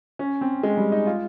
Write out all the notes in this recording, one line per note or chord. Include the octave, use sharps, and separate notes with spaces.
C#4
C4
G#3
G3
D#4
F4